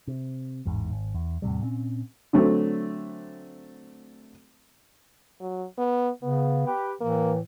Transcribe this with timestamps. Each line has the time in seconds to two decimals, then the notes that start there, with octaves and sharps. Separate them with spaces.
0.07 C3
0.65 A1 E2 G#2
0.91 G#1
1.14 E2
1.42 E2 A2 C3 G3
1.62 A#2 C4 C#4
2.33 D3 F#3 A3 C4
5.40 F#3
5.78 B3
6.23 C#3 B3
6.66 G4 B4
7.01 A2 E3 A#3